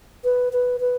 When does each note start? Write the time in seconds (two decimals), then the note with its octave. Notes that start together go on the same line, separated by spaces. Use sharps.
0.24 B4
0.53 B4
0.81 B4